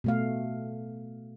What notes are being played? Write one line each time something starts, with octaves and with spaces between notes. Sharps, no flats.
B2 A3 F5